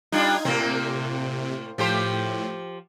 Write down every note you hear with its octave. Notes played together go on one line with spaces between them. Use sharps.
G3 D4 D#4 F4 G#6
A2 C3 A#3 C4
A2 F3 G4 C5